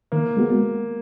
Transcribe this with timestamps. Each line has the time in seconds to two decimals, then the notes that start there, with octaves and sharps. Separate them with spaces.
0.12 D#3 A#3
0.37 G#3 B3 F#4